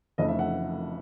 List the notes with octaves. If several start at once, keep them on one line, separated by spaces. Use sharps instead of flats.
F1 F2 C#3 E3 A3 D#5
E5
F#5